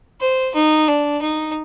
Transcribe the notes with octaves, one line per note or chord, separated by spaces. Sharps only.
C5
D#4
D4
D#4